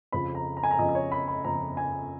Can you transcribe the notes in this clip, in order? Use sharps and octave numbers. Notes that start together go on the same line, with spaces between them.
F2 C#3 F3 B5
A#5
A#5
G#5
A#5
F2 C#3 F3 D#5
D#5
C#5
B5
B5
F2 C#3 F3 A#5
G#5